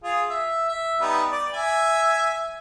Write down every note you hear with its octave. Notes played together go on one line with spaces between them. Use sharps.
F4 G#4
E5
E5
G3 B3 D#4
D5
E5 G#5